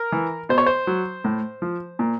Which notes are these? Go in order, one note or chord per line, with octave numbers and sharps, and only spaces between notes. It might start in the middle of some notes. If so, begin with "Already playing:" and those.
Already playing: A#4
E3
B2 C5
C#5
C5
F#3
A2
F3
A#2